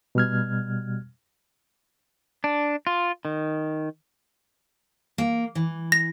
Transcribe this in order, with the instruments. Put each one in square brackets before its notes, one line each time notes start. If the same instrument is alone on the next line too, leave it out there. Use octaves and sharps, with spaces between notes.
[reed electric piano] B2 G3 F6 G#6
[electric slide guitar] D4
F4
D#3
[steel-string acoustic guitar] A#3
E3
[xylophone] A#6